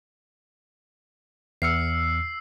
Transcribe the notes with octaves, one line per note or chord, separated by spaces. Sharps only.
E2 E6 F6 C7 C#7